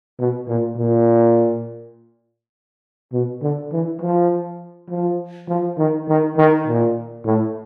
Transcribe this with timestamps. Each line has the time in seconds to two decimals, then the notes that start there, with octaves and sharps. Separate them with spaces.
0.19 B2
0.48 A#2
0.78 A#2
3.13 B2
3.42 D3
3.72 E3
4.02 F3
4.90 F3
5.49 F3
5.78 D#3
6.09 D#3
6.37 D#3
6.67 A#2
7.25 A2